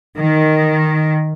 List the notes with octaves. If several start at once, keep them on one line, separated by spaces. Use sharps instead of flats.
D#3